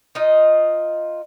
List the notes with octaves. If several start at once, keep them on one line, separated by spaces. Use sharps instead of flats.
D#4 F4 D#5